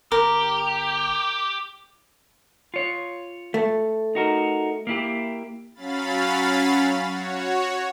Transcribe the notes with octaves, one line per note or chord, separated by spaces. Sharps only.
G1 G4 A#4
F4 C#5
A3
D#4 F#4 A#4
A#3 E4 G4
F#3 C#4 F5 B5 A6
F#4 C#5